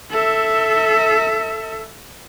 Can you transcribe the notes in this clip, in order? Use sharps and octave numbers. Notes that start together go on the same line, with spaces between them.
A4 E5